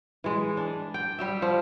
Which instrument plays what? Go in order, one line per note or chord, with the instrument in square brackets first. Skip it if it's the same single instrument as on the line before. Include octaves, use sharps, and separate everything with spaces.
[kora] E3 G#3
D4
G5
G3 G4 E5
F3